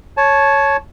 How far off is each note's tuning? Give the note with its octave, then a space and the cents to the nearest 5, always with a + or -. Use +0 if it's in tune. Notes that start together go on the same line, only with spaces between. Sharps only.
C#5 +0 A5 -20